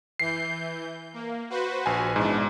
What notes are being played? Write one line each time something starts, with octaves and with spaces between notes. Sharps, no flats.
E3 G6 C7
A#3
F#4 B4 C5
A#1 G#5
G#2 B2 E3 D4